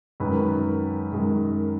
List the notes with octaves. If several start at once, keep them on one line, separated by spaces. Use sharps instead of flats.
F#2 D#3 G#3 B4
F#2 D#3 G#3